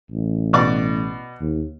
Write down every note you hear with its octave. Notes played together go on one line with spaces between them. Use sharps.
A1
B2 D5 D6
D#2